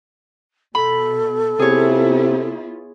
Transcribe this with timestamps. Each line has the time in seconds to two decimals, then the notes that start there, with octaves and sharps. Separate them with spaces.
0.75 B2 A4 B5
1.59 C3 B3 E4 F4 G#4 C#5